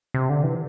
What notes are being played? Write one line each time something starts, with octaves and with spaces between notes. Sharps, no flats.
C3
D3
E3